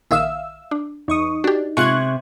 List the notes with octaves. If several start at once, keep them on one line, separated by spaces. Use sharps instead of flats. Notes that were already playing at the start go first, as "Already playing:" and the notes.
A#1 D#3 E5 F5 D#6 E6
D4
E2 D#4 C#6 D#6
D4 F#4 G4
C3 G#3 F4 C#6 F#6 G#6